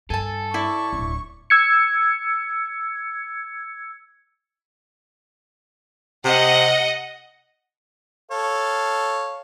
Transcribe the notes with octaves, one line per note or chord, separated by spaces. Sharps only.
G2 A4 G#5 A5
E4 D5 C#6
D1 D4
E6 G#6 C#7
C3 D#5 F#5
A4 C#5 F5